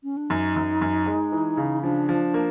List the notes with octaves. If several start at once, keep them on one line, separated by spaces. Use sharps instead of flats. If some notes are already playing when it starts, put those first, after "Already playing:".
C#4
D4
F#2 D#4
F#2
F#2
G#3
E3
C#3
F3 D4
F3
A#3